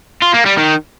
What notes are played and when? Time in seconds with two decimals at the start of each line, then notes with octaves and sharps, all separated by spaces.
0.22 F4
0.34 A#3
0.46 G3
0.58 D#3